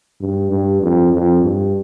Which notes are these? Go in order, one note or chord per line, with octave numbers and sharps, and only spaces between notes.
G2
G2
F2
F2
G2